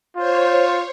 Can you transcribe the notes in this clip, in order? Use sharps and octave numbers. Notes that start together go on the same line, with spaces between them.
F4 C5 C#5